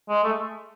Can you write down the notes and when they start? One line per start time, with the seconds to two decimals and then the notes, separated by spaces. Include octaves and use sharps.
0.09 G#3
0.24 A3